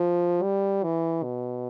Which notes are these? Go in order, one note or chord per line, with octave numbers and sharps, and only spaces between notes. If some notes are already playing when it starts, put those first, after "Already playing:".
Already playing: F3
G3
E3
B2